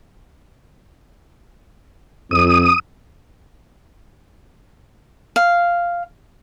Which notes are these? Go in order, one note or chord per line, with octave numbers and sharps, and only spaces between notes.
F2 D#6
F5